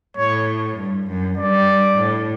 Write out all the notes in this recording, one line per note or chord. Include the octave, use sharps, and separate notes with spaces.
A2 C#5
G2
F#2
G2 D5
A2